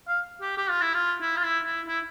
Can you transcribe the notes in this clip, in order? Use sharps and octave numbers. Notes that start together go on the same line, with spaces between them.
F5
G4
G4
F4
E4
F4
E4
F4
E4
E4
E4